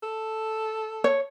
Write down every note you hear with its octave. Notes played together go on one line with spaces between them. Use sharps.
A4
C#5